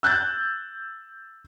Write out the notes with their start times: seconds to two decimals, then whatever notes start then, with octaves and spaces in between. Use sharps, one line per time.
0.03 E6 F#6 G6 A6